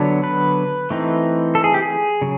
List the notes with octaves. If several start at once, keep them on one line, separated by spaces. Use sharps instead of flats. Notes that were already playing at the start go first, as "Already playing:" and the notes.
Already playing: D3 F#3 B3 D4
B4
E3 A3 C4 D#4
A4
G#4
G4
G#4
C#3 F#3